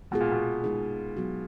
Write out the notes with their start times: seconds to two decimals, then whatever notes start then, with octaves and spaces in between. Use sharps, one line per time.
0.11 B2 G#3 B3 F4 G#4
0.21 A#2
0.32 B2
0.64 G#3 D#4 G#4
1.17 F#3 B3 F#4